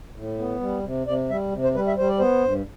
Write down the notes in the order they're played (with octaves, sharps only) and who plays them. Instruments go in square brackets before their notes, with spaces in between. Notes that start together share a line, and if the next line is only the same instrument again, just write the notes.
[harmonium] A2
B3
G3
C3
C3 D5
G3 E5
C3
C5
G3 B4
E5
G3 C5
D5
B3 C5
G2